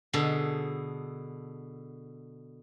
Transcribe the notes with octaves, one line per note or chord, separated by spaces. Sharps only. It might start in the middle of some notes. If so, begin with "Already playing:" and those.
B2 D3 G#4 A4